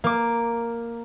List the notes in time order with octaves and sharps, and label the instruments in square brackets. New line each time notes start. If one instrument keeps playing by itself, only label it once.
[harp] A#3 D6